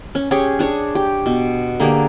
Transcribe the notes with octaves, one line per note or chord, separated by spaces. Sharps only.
C#4
C#4 G4 G#4 C#5
D4 G#4 C#5
G4
B2
D3 A#3 G4 G#4